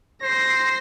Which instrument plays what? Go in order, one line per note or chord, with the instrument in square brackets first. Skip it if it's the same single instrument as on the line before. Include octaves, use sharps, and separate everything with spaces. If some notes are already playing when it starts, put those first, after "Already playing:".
[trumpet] C5 [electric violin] A#6 C7